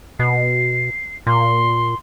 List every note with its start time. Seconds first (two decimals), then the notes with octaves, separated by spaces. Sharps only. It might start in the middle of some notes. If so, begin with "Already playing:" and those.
0.19 B2 C7
1.27 A#2 C6